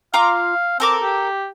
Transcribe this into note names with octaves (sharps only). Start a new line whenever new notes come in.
F4 F5 A#5 D6
C4 A4 A#4 D6
G4